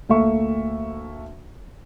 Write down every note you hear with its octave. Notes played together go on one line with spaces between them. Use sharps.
D2 A3 A#3 E5 C#6